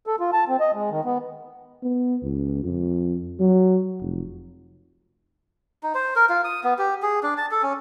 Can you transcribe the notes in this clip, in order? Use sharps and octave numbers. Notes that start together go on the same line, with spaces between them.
A4
F4
A5
C4
D#5
G#3
D#3
B3
B3
C#2
F2
F#3
F1
D#4
C5
A#4
F4
D#6
B3
G4
G#4
D4
A5
A4
C#4